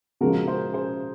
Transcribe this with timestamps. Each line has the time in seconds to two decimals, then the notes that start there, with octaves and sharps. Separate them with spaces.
0.21 C#3 F3 G#3 F#4 A#4
0.47 G#4 C5
0.74 G#4 C5